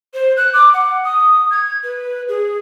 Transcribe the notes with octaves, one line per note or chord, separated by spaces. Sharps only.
C5
F#6
D6
F#5
D#6
G#6
B4
G#4